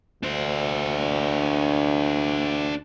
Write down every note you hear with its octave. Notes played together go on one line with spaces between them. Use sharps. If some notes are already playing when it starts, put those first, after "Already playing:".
D2 D4 C5